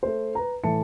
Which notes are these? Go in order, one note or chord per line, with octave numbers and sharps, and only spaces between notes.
A3 C5
B4 A#5
A2 E3 A3 A5 C#7